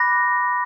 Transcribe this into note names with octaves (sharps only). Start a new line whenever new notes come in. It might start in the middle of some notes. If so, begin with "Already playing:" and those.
Already playing: B5 D6 F#6 A#6